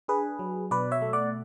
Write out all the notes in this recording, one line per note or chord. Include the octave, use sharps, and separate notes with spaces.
D4 G#4 B4
F#3
B2 B4 D5
C#5 E5
A3
D5 F#5